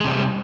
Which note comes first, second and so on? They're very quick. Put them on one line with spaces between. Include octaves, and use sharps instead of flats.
G#3 C3 G3